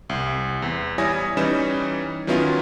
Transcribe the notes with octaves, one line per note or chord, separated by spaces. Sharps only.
C2
E2
G3 E4 C#5 G#5 D#6 A#6
E3 G3 C#4 D#4 B5 E7
D#3 F#3 B3 C#4 E4 F4